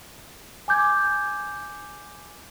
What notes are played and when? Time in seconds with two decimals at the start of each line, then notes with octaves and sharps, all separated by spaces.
0.68 G#5 D6 G6 G#6